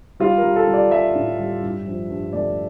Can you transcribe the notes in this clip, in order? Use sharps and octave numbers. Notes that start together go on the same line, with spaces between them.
G3 F4
A#4
G3
A4
G3
D5
G3 E5
A2
G3
G2
F3
G2
A3 D5